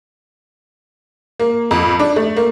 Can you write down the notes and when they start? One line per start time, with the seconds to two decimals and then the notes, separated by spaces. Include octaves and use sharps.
1.40 A#3
1.71 F2
1.99 D4
2.16 A3
2.37 A#3